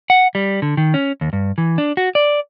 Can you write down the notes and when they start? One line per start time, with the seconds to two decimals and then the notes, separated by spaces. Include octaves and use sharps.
0.10 F#5
0.35 G3
0.62 D3
0.77 D#3
0.94 C#4
1.21 D#2
1.33 G2
1.58 E3
1.78 D4
1.97 F#4
2.15 D5